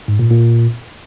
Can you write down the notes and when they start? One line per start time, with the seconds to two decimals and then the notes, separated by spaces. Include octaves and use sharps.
0.08 G#2
0.19 A#2
0.31 A#2